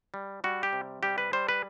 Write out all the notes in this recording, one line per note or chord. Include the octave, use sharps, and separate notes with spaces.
G3
G3 F#4
G4
C3
G3 G4
B4
G3 C5
B4